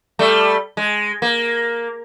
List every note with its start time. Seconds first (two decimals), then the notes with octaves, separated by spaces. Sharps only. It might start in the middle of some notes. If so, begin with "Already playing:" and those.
0.19 G3 A3
0.77 G#3
1.22 A#3